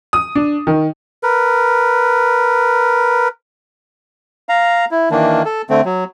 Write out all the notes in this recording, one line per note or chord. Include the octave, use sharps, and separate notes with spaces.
D#6
D4
D#3
A#4 B4
F5 A#5
E4
D#3 E3 A#3 D4
A4
D3 A3 C4
F#3